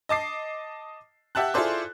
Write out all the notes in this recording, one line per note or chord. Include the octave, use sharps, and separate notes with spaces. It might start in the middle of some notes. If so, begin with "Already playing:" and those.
D#5 A5 D6 C7
G4 E5 F#5 A5 F#6
E4 F4 G#4 A4 C5 D5